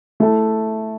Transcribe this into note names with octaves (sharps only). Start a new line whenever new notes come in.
A3 E4 A4